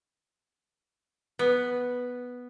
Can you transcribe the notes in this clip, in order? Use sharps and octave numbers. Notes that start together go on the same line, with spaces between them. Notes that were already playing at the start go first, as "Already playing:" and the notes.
B3